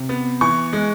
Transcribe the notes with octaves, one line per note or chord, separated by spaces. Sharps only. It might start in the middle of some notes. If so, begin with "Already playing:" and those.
Already playing: C3
B3
E3 C#6
G#3